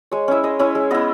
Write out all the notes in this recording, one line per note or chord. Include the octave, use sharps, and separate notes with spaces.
G#3 C#5
C#4 E4 E5
G#3 D#5
C#4 E4 C#5
G#3
B3 E4 D#5